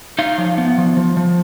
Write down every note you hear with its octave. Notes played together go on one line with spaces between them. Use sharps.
D#4 F5
F3
B3
F3
F3
F3